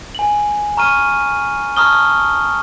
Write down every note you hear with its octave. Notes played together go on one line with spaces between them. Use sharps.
G#5 F#7
A#5 C#6 F6 D#7
A5 A#5 C#6 D#6 F6 G7